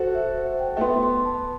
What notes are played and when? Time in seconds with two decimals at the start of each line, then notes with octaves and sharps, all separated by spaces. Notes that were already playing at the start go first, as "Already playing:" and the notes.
Already playing: F#4 A4 C5
0.15 E5
0.37 C5
0.59 G5
0.77 A3
0.81 B3 C6
1.03 C6
1.25 A5